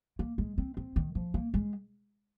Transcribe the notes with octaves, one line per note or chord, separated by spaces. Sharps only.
A#3
G#3
C4
C4
D#3
F3
A#3
G#3